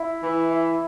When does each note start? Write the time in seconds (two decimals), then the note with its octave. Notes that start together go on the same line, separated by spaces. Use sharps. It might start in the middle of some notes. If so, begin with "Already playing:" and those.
Already playing: E4
0.22 E3
0.49 E4